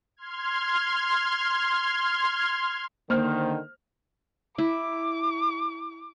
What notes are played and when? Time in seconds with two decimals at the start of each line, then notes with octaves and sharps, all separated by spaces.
0.17 C6 F6 G#6
3.10 D3 D#3 A#3 C5 F6
4.58 E4 D6